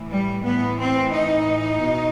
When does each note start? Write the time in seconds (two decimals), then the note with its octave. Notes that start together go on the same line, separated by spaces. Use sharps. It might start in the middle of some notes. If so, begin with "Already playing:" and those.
Already playing: A2 E3
0.10 G3
0.43 A2 E3 B3
0.78 C4
1.12 D#4
1.80 B2